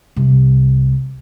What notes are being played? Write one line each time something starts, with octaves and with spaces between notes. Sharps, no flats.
C2